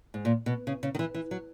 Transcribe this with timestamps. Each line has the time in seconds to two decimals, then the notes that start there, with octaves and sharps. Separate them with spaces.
0.14 G#2
0.25 A#2
0.46 B2
0.67 C#3
0.83 C#3
0.95 D#3
0.99 E3
1.14 E3
1.31 F#3